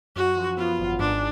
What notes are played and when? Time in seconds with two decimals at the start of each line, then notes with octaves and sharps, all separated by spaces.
0.16 F#2 F#4
0.36 F3
0.57 B3 F4
0.79 G#1
0.99 G#2 D4